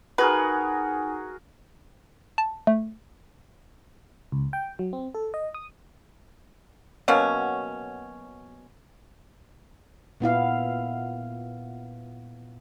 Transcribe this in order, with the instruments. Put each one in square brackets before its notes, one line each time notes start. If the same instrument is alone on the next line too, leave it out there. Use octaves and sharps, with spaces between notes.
[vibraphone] D#4 G#5 [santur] F#4 G#4 A#4 [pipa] B4
[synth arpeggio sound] A5
A3
[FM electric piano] C#2
G5
F#3
C4
A4
D#5
D#6
[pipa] B2 F#3 A#3 C#4
[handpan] A#2 B3 E4 F5